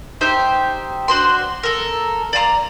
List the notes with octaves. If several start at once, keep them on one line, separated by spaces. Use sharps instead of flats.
D#4 G4 C5 E5
D4 F#4 C5 C6
A4 A#4
D5 F5 A5 A#5